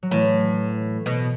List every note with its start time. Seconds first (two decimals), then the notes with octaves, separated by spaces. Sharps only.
0.03 F#3
0.11 A2 E3
1.06 B2